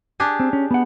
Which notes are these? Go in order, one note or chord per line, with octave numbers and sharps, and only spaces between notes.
D4 G4 G#4
C4
C#4
B3 F#5